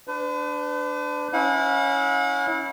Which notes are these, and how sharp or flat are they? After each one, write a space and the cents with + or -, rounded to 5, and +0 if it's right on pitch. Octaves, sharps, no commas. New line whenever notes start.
D4 +0 B4 +45
C#4 +0 E4 -25 F#5 -45